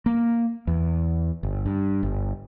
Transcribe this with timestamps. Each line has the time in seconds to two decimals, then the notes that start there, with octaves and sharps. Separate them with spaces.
0.06 A#3
0.67 E2
1.43 G1
1.66 G2
2.03 G1